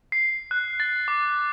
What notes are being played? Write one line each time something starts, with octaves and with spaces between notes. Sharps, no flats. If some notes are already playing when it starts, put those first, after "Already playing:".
C7
F#6
A6
D6